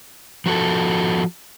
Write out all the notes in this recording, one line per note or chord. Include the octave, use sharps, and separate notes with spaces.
F3 F#4 A4